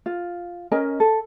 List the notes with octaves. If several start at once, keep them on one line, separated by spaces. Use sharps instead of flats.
F4
C#4 A#4 D#5 G#5
A4